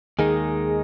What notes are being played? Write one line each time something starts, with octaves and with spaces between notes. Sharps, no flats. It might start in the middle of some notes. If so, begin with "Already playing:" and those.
D#2 D#3 G#3 D#4 G#4